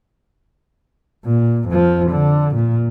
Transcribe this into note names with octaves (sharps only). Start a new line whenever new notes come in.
A#2
F2 F3
D3
A#2